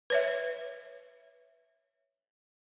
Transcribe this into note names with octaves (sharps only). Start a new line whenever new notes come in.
B4 C#5 E5